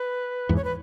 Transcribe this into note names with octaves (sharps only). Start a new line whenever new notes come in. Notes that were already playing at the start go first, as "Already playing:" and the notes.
Already playing: B4
E2 G#2
C#5
B4